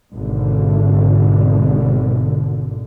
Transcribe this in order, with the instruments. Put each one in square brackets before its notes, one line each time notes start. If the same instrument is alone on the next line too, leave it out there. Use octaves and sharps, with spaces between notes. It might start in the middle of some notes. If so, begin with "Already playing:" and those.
[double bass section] G#1 B2 D3